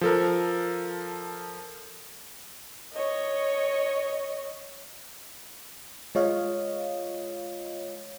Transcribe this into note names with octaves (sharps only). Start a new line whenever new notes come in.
F3 A4 A#4
C#5 D#5
G#3 F4 C#5 D#5 F5